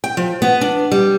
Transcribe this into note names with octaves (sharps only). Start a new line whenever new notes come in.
G5
F3
B3
D4
G3